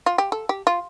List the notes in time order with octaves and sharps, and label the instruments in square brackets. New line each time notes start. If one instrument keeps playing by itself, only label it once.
[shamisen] F4
G4
A4
G4
F4